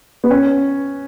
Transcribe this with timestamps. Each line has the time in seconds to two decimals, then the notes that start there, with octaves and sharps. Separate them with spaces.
0.24 B3
0.31 C#4